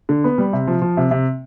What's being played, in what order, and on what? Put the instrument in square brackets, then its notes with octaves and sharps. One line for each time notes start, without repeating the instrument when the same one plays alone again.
[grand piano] D3
B3
G3
C3
F3
F3
C3
C3